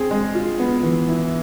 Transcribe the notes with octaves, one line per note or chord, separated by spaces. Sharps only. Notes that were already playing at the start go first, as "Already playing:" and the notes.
Already playing: C4 G#4
G#3
F4
B3
E3
E4